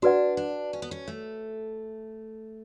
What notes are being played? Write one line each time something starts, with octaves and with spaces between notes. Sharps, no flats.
D4 F#4 B4 D5 F#5
D4
C#4
B3
C#4
A3